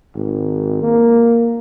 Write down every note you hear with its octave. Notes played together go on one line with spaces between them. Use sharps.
G#1
A#3